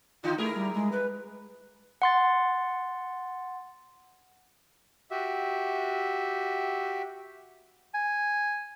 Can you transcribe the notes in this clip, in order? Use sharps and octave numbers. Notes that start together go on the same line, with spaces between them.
D3 D#4 F4
A3 E4 G#4 A#4
G3
G#3
B4
F#5 C6 A6
F#4 G4 E5
G#5